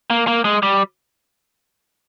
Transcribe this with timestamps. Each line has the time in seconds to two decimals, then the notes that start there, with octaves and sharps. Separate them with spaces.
0.10 A#3
0.27 A#3
0.45 G#3
0.63 G3